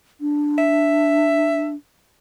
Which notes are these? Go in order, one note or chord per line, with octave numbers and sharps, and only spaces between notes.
D4
E5